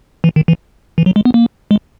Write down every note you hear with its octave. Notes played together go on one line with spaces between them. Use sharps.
E3
D#3
E3
E3
F#3
G#3
B3
A#3
G#3